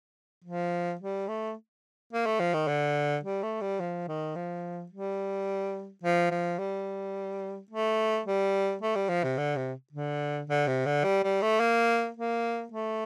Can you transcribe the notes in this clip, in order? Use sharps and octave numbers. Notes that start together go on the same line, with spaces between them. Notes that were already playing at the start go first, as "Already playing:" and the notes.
F3
G3
A3
A#3
A3
F3
D#3
D3
G3
A3
G3
F3
D#3
F3
G3
F3
F3
G3
A3
G3
A3
G3
F3
C3
D3
C3
D3
D3
C3
D3
G3
G3
A3
A#3
A#3
A3